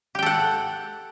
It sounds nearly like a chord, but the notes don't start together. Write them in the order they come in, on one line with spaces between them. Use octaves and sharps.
G4 G5 A4 F#5